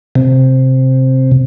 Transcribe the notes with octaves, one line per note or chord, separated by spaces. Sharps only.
C3